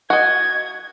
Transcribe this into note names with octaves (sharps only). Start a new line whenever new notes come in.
F#4 D#5 G#6